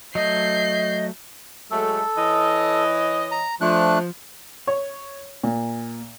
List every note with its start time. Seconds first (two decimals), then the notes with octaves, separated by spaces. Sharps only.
0.15 F#3 A3 D#5 G6 C7
1.71 F#3 G#3 A3 A4
2.17 E3 C#5 D#5
3.32 A#5
3.61 F3 A3 D4 F#6
4.67 C#5
5.43 A#2